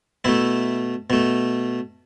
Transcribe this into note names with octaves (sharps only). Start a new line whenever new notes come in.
B2 A3 E4
B2 A3